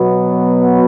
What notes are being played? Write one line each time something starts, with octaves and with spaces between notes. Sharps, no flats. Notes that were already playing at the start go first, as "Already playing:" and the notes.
Already playing: B2 F#3 B3